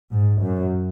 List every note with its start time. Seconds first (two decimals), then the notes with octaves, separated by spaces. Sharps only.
0.12 G#2
0.42 F#2